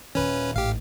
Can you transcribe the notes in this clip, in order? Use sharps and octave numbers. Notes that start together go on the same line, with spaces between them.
D#1 D#3 C#4 B4
A1 G#2 G4 F5